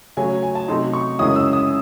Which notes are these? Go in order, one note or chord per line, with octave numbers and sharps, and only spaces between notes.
C#3 F#3 A3 C#4 G#5
G#5
A5
C3 F#3 A3 D#4 C6
C#6
F#2 C#3 G#3 C#4 E4 D#6
E6
D#6